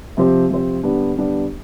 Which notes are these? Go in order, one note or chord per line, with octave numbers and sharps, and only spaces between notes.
C3 F3 C4 G4 C5
C3 F3 C4 G4 C5
D3 G3 B3 D4 G4
D3 G3 B3 D4 G4